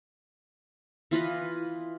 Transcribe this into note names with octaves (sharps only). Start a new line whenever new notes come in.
E3 F4 B4 D#5